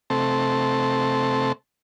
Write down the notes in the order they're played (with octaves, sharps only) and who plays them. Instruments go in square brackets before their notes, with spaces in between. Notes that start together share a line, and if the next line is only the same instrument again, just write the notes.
[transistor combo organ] C3 A3 C4 A4